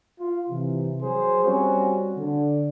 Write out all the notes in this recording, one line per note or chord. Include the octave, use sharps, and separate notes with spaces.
F4
C3 E3
F#3 G#4 C5
G3 C4 C#4 F#4
D3